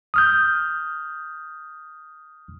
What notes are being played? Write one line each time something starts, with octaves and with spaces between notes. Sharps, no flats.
D#6 F6 G6